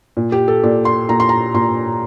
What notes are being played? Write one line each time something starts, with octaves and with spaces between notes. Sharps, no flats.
A#2
G4
A4
A#2 D5
C6
A#2 A#5
C6
A#5
A#2 C6